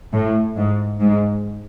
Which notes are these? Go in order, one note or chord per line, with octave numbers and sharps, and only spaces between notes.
A2
G#2
G#2